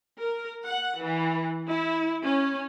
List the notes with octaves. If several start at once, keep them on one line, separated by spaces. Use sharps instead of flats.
A#4
F#5
E3
E4
C#4